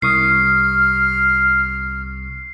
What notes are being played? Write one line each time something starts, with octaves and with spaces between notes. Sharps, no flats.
C2 C#6 D#6 F6 C7